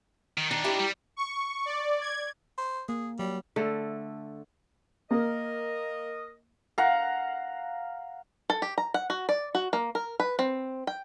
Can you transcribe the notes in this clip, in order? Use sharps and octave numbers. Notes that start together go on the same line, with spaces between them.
D#3
D#3 D4 D#4
E4 G4 A#4
G3
C#6
D5
G#6
C5
A#3 G#4
F#3 G3
D3 A3
A#3 A#4 D#5
F5 F#5 A#5
A4
G4
A#5
F#5
F#4
D5
F#4
A#3
A#4
B4
C4
G5